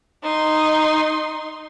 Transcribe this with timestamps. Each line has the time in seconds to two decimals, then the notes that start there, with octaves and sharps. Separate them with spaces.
0.23 D#4 C6